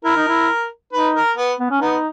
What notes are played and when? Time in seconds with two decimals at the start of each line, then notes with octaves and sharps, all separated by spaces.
0.05 E4 A#4
0.16 D#4
0.28 E4
0.93 D#4 B4
1.16 A#4
1.37 B3
1.60 B3
1.71 C#4
1.81 B3 D#4